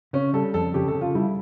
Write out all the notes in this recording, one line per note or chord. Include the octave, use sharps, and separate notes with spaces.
C#3 C#4
G3 A4
F2 A4
C#3 G4
A4
C#3
F4
G3 E4